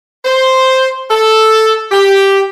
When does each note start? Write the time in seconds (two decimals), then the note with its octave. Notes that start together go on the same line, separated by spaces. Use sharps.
0.25 C5
1.10 A4
1.92 G4